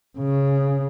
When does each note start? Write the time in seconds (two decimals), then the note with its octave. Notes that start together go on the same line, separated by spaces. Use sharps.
0.19 C#3